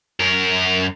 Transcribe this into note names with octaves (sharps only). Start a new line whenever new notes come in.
F#2 A#4